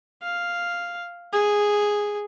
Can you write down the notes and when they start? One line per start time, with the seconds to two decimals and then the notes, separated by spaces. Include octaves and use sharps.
0.22 F5
1.33 G#4